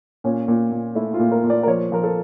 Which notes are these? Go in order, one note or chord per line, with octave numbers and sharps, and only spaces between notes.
A#2 C#4
A#2
A#2
A3 E4
F4
A#2
A#4
A#2
D5
A#4
F3 C#5
F3 A#4
A4